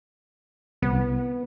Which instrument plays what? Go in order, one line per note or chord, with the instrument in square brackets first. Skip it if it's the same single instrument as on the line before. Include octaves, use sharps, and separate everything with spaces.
[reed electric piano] C2 [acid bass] B3